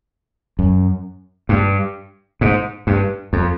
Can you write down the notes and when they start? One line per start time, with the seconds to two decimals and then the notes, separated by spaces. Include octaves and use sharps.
0.59 F#2
1.49 G2
2.41 G#2
2.87 G2
3.33 F2